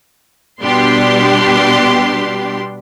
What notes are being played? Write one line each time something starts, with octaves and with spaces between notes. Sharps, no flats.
B2 G3 B3 D4 G4 C6